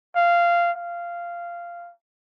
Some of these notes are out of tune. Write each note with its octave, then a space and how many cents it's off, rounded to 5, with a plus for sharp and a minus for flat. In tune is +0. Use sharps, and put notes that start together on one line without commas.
F5 -15
F5 -10